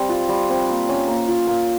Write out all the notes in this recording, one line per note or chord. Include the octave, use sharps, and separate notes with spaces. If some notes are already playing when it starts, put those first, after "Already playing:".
Already playing: G3 C4
F4
G3
C4
A#3
C#4
A#3
F4
A#3